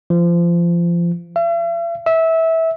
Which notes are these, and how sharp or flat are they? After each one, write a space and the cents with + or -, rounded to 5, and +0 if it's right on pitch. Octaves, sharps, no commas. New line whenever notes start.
F3 -25
E5 +45
E5 -20